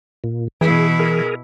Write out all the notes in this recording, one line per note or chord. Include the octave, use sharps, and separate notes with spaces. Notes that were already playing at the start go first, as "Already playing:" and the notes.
A#2
B2 E3 E4 G#4
G#4 A#4